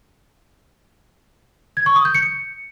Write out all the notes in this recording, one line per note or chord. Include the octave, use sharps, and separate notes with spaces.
G#6
C#6
D#6
G6
C#7